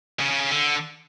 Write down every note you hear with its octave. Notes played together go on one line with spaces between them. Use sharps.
C#3
C#3
C#3
D3